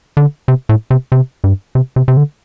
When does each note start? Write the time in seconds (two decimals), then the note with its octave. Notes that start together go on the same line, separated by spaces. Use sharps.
0.17 D3
0.48 C3
0.69 A2
0.90 C3
1.12 C3
1.44 G2
1.75 C3
1.96 C3
2.08 C3
2.17 D3